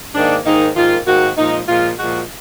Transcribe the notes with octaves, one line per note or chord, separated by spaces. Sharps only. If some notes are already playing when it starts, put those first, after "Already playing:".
G#2 D#3 A#3 D4
G#2 D#3 A#3 D#4
G#2 D#3 A#3 F4
G#2 D#3 A#3 F#4
A#2 F3 G#3 D#4
A#2 F3 G#3 F4
A#2 F3 G#3 F#4